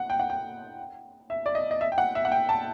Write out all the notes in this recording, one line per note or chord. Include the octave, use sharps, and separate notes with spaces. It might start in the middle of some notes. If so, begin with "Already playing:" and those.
Already playing: F#5
G5
F#5
G5
E5
D5
D#5
D#5
E5
G5
F#5
E5
F#5
G5
A5